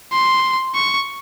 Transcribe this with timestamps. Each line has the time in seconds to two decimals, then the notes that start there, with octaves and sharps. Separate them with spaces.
0.13 C6
0.75 C#6